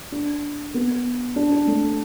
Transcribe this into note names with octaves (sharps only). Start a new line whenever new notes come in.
D4
B3
D4
D4
A3